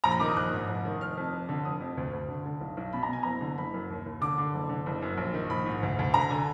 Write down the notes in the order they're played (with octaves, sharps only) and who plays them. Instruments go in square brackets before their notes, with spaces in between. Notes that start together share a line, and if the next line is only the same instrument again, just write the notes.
[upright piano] A#1 A#5
B5
D#3 D6
D#6
A#1 F#6
G#2
F1
D#3
F1 F6
F2
F1
D3
F1 D#6
F2
D2
D2
D3
D3
B1
B1
B2 B5
A#5
B2 G#5
F#1 A#5
D3
F#1 B5
F#2
D#2
D#2
D3 D6
D3
F#1
D3
F#1
F#2
A#1
D#3
A#1 B5
G#2
D2
D2
D3 A#5
D3 G#5